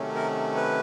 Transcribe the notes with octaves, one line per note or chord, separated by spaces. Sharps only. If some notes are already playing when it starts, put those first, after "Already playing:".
Already playing: C3 D#3 F#3 A3 C#4
A#4
B4